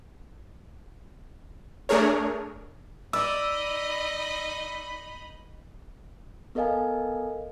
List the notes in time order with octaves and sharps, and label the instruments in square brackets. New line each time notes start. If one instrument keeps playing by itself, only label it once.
[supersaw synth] A3 D4 G#4 A#4 C#5
[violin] D#4 D#5 [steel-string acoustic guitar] D5 [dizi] B5 [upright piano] E6
[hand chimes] B3 A4 A#4 D#5 F5 G#5